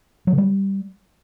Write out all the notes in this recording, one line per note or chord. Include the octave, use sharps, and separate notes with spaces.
F#3
C#3
G3